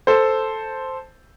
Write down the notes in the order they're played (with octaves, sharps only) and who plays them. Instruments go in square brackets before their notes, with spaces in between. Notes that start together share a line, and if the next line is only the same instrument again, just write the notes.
[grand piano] A4 C5